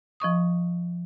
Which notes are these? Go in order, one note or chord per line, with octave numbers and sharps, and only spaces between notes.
F3 D#5 C#6 D#6